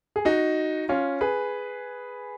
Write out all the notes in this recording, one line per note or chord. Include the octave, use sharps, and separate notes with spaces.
G#4
D#4 F#4
C#4 F4
G#4 B4